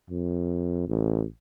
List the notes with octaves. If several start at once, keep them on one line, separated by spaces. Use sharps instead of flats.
F2
A1